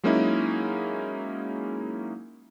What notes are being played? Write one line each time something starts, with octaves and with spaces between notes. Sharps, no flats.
F#3 G#3 A#3 C#4 D#4 E4